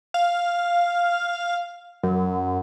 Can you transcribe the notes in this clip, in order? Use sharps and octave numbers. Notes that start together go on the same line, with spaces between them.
F5
F#2